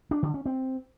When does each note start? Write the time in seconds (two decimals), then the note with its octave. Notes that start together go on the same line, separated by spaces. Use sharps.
0.11 D4
0.23 D3
0.34 C#4
0.46 C4